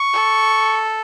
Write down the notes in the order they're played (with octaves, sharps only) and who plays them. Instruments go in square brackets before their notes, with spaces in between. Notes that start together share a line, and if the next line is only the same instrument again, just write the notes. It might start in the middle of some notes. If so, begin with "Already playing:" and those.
Already playing: [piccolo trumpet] C#6
[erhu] A4